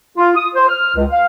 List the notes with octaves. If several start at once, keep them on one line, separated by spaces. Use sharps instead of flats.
F4
D#6
C5
F6
C#2
F5